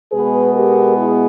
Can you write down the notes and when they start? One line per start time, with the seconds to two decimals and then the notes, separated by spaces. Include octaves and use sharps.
0.12 B2 G#3 B3 G#4 B4
0.54 G4 A#4
0.96 E4 G#4